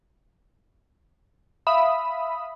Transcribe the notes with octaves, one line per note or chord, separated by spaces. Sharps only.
E5 F5 B5 D#6